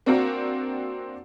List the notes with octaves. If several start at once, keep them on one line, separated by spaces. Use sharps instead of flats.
A#3 C4 D4 F4 F#4 A#4